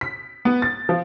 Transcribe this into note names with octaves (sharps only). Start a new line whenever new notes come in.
B6
B3
A6
F3